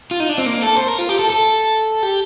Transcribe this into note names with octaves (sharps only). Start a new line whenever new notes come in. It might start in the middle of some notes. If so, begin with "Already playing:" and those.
F4
D#4
D4
C4
A#3
A4
C5
A#4
F4
G4
A4
A4
G4